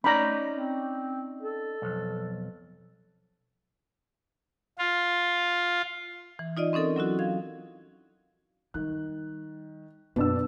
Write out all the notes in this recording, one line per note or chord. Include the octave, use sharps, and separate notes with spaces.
A3 C#4 D#4 D5 A#5 B5
C4
A4
B1 F2
F4
E3
D#4 F4 D5 D#5
C4 C#4 D#4 A4 A#4
F#3 C#4 E4 F#4
F5 G#6
D#3 G3 F#6
F#2 B2 D4 B4 E6